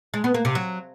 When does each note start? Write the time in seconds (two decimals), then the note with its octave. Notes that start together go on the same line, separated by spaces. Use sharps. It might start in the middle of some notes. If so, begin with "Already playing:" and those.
0.14 G#3
0.24 B3
0.34 A#3
0.45 C3
0.55 F#3